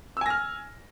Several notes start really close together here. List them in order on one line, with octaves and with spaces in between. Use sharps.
E6 G#5 A#6 F6